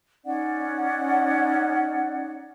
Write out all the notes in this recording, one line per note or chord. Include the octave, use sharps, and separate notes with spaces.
C#4 D#4 D5 F#5